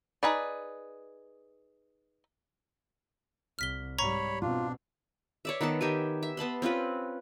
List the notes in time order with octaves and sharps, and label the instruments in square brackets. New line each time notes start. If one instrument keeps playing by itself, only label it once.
[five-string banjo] D#4 G#4 B4 D5
[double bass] C2 [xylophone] F6 B6 G7
[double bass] G#2 G3 [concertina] C#5 B5 [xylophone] A#5 C#6 G#6
[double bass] B2 C4 [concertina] D4 [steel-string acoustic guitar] F4
[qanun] C#5 D5 E5
D#3 B3 A4 A5
D#3 G4 E5 G#5
E5
B3 A5 B5 C6
C4 C#4 F4 B4